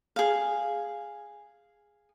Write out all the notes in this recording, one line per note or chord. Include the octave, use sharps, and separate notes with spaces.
G#4 F5